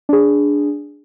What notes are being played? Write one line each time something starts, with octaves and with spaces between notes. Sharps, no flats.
D4 G#4